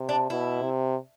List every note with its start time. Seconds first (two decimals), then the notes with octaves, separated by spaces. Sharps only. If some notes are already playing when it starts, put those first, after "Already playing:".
Already playing: C3
0.09 D4
0.30 B2 E4
0.62 C3